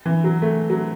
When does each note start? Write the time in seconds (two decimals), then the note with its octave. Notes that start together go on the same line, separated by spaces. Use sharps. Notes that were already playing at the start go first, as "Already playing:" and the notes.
0.06 E3
0.24 F#3
0.42 A3
0.70 F#3